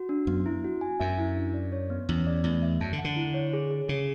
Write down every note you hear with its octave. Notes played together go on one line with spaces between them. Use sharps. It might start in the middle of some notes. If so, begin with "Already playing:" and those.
Already playing: F#4
D4
F#2 B3
E4
F#4
G#5
F#2 E5
E4
D4
D5
C#5
B3
E2 C#4
D5
E2 A3
E5
F#2 A5
D3
F#5
D3
E4
C#5
G#4
G#4
C#3 G#4